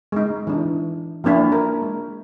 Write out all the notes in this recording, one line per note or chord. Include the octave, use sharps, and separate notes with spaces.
G#3 D#4
E3 D4
F3 A#3 D4 E4
A#4
G#3